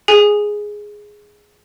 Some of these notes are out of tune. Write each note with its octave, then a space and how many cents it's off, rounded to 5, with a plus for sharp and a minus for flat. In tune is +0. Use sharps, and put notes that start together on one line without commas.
G#4 +0 G#5 +0